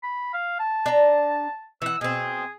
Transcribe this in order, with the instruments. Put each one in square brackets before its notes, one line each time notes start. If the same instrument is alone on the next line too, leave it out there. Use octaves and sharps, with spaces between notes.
[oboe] B5
F5
A5
[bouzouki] D4 A#5
[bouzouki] E3 F#5 [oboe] E6
[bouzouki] B2 C4 [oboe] G#4